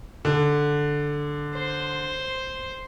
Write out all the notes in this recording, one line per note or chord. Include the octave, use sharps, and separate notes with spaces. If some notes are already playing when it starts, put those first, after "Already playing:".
D3
C5